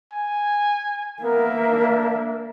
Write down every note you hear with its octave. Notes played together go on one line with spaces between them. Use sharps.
G#5
A#3 B3 A#4 E5
D4